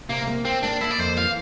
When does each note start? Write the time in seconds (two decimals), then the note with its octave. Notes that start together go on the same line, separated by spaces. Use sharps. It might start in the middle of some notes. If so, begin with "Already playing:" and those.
0.09 C3 A#3
0.27 A#3
0.45 A#3 C4
0.63 A#3 D4
0.81 A#3 E4
0.91 D5
0.99 F2 C5
1.17 E3 F5